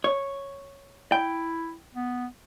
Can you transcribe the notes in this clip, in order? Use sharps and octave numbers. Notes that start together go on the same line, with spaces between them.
C#5
E4 G5
B3